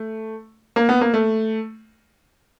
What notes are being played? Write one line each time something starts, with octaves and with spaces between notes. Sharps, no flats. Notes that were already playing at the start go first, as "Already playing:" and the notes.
Already playing: A3
A#3
B3
A#3
A3